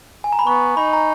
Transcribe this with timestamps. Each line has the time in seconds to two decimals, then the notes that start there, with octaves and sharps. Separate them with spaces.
0.24 G#5
0.33 A#5
0.39 B5
0.46 B3 C#6
0.77 D#4 B5
0.93 A#5